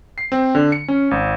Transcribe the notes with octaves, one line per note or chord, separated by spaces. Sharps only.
C7
C4
D3
C#7
C#4
G#1